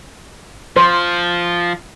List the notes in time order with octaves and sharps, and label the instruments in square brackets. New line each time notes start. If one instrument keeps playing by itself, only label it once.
[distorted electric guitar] F3 [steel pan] C5